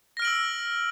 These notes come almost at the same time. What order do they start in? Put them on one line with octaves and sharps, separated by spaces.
A#6 F6 D7 F#7 E6